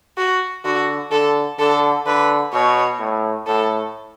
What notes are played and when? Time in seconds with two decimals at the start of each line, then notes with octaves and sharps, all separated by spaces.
0.18 F#4
0.64 D3 F#4
1.11 D3 A4
1.59 D3 A4
2.06 D3 B4
2.53 B2 C#5
2.99 A2
3.47 A2 A4